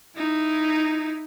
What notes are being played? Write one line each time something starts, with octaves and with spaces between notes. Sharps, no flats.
D#4 E4